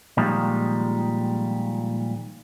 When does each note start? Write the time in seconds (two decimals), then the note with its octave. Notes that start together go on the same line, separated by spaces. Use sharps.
0.17 A#2 D#3 F3 G3 G#3